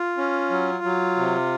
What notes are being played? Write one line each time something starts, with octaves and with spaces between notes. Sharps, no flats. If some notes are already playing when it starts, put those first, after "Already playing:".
Already playing: F4
C#4
F#3
F#3
C3